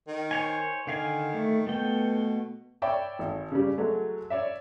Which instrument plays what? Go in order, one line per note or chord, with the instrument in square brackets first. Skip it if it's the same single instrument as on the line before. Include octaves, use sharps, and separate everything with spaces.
[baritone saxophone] D#3
[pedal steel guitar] C5 C#5 G#5
[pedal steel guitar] D3 F5 G#5 [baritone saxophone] D#3
[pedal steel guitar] A3
[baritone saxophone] B2 [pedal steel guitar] A3 B3 G5
[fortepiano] C#5 D5 E5 G5 B5 C#6
G#1
C#3 G3
F#3 G#3 A3
C#5 D5 E5